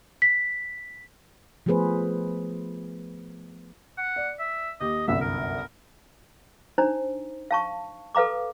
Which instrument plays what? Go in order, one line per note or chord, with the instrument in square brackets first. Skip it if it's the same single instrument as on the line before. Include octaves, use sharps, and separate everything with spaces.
[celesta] B6
[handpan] F3 A3 B3 G#4 B4 C5
[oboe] F#5
[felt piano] D5
[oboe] E5
[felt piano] D#2 G4 [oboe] D#5
[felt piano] G1 C2 F#2 [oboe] E5
[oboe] A#4
[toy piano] D4 D#4 C5 A#5
F5 A5 C#6
A4 B4 F5 A#5 D6